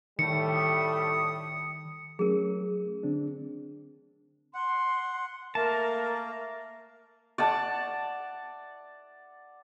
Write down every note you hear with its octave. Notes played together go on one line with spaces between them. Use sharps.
A2 D#3 G3 A3 C#7
D#6
F#3 A3 C#4 G#4 A#4
D3 C4 D4
F#5 C6
A3 A#3 A#4 A5 A#5
D5 F#5 A5